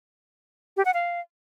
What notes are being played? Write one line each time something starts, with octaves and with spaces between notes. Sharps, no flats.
G4
F#5
F5